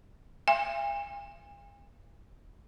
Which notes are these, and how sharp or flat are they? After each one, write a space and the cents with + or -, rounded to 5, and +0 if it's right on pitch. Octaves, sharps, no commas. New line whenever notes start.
E5 +45 G#5 -45